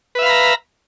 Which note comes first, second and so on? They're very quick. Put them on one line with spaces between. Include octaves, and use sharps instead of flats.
B4 E5 F5 B5 A#5